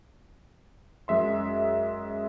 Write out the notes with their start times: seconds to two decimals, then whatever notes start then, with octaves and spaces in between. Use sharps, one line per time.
1.08 F#2 G#3 E5 C6